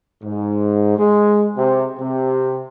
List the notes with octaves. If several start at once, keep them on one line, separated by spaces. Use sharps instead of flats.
G#2
G#3
C3
C3